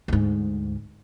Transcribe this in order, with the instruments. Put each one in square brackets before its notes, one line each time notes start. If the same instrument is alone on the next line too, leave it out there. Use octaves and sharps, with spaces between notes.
[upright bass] D2 G#2